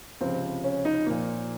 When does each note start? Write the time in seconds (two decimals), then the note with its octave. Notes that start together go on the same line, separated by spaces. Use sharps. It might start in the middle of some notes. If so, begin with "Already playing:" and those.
0.21 C#2 C3 F3 C4
0.64 C#4
0.85 D#4
1.06 A#2 F3 A#3